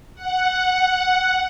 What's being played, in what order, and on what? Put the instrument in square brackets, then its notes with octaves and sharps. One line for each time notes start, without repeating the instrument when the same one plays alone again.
[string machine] F#5